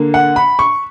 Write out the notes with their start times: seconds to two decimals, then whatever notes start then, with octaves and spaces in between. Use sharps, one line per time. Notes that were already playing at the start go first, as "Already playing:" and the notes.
Already playing: D3 A#3
0.14 F#5
0.36 B5
0.59 C#6